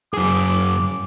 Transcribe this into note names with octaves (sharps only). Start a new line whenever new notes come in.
F#2 G#4 D6